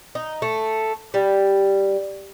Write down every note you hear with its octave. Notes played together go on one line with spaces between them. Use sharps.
D#4
A3
G3